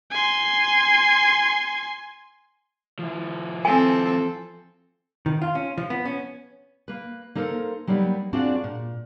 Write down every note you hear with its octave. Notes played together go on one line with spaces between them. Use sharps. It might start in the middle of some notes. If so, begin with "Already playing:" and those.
G#5 C6
F3 E4
C4 A4 G#5
D#3
F4
C#4
F3
B3
C#4
A#3 B4
A#3 D#4 A4 A#4 C5
F#3 G3 A#3 B3 C#4 D#4
C4 D4 F4 F#4 G#4 D5
A#2